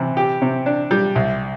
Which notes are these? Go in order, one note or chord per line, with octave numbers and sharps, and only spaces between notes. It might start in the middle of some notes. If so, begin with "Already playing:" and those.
Already playing: C3 E3
G4
C3
D4
G3
C2